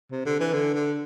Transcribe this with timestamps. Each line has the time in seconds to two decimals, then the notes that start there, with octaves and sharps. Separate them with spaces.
0.11 C3
0.26 D3
0.40 E3
0.53 D3
0.74 D3